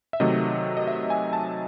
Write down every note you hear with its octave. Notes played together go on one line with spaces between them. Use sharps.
E5
C3 D#3 F#3 A3 D#5
D#5
E5
G#5
A5